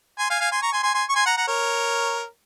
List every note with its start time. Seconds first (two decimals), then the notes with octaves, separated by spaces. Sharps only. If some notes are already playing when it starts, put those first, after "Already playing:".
0.19 G#5 C6
0.30 F5 G#5
0.40 F5 G#5
0.51 G#5 C6
0.62 A#5 C#6
0.72 G#5 C6
0.83 G#5 C6
0.94 G#5 C6
1.09 C#6
1.15 G#5 C6
1.26 F#5 A#5
1.37 F#5 A#5
1.47 A#4 C#5